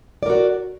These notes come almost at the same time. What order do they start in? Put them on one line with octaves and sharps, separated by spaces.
D5 A#4 F#4